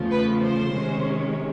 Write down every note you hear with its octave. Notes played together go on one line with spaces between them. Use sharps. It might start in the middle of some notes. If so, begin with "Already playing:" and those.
Already playing: E2 C#3 F3 A3
B4
C5
C3 D#3 G#3 C#4